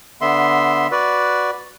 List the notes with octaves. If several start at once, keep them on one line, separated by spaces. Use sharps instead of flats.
D3 B3 E5 C6
F#4 B4 D5